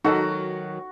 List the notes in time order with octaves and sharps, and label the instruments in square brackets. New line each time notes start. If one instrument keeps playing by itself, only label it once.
[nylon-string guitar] D#3 F#3 [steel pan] D#4 A4 [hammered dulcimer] F#4